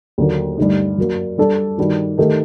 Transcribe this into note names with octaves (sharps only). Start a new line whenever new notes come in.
D#2 D3 F#3 A#3
G2 D3 A3 D#4
F#2 F#3 A#3
G3 D4 A4 D5
G2 D#3 G3 D4 F#4
D#3 A3 D#4 G4 A#4